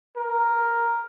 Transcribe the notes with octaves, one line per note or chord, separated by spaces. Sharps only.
A#4